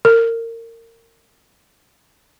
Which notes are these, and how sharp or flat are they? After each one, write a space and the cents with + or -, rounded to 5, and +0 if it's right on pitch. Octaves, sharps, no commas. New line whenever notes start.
A#4 -25